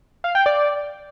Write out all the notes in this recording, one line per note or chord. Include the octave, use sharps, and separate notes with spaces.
F5
G5
D5